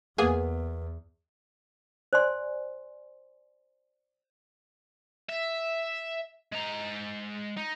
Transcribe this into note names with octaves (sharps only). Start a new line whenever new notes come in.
E2 A#3 B3 G#4
C5 D5 G#5 C6
E5
G#3 A#5
D#4